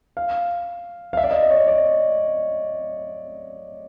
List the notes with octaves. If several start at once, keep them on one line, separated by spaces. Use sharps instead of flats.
F5
F5
E5
D5
D#5
D#5
C#5
D5
D5